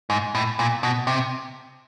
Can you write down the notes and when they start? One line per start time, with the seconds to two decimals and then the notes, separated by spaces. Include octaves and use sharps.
0.10 G#2
0.35 A2
0.59 A#2
0.83 B2
1.07 C3